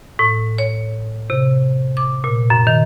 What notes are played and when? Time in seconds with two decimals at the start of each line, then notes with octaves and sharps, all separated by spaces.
0.19 A2
0.58 C#5
1.30 C3
1.97 D6
2.24 A#2
2.50 F#2
2.67 D#3